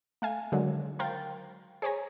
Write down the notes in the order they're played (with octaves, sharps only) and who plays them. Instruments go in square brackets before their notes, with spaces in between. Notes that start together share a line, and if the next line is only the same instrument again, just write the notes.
[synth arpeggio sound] A3 F5 G#5
D3 D#3 F#3 G#3
A#4 C5 F5 G5 G6 A6
G#4 C5 C#5 G#5 A#5